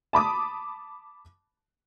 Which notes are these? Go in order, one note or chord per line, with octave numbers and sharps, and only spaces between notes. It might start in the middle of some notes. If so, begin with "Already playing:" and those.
A5 B5 D6 D#6